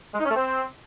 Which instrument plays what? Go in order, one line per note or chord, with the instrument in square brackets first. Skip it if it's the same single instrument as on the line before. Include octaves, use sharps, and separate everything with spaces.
[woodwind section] G#3
D#4
C#4
A3
C4